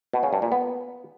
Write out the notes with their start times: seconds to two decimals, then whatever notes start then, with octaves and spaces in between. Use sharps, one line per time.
0.13 B2
0.23 C#3
0.33 G2
0.42 A#2
0.52 B3